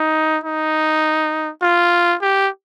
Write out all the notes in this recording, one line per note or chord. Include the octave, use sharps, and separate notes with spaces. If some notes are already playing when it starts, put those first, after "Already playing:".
Already playing: D#4
D#4
F4
G4